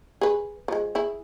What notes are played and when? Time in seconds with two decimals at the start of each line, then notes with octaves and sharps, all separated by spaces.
0.21 G#4 B4
0.68 F3 G#3
0.95 E4 G#4